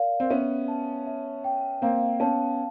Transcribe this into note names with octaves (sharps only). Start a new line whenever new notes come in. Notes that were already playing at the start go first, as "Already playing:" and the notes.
Already playing: A#4 D5 F5
C4
B3 C#4 E5
A5
E5
G5
A#3 C4 F5
B3 C#4 A5